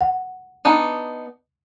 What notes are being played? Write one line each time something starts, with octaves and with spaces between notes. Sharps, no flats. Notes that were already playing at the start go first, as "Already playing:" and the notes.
F#5
B3 D4 D#4